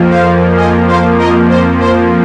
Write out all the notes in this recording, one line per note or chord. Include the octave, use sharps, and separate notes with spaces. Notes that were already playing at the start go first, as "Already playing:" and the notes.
Already playing: F2 F3 A#3
C5 F5
D#5 G#5
C5 F5
A#4 D#5
C5
C5